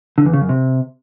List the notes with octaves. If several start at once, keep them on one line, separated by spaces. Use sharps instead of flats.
D3
E2
C#3
F#2
C3